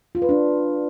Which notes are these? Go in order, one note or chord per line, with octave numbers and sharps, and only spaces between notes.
F4
B4
D4